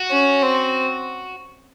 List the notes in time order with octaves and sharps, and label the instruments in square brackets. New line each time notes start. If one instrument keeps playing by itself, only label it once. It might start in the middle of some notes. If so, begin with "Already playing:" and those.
Already playing: [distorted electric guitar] F#4
[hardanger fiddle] C#4
C4